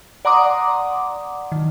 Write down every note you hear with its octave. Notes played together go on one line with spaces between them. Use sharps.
D5 F#5 A#5 C6 D6 D#6
D#3